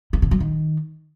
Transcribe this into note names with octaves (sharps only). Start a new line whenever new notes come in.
D#3
D3
F#3
D#3